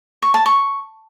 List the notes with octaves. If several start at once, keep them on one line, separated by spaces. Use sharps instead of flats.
C#6
A5
C#6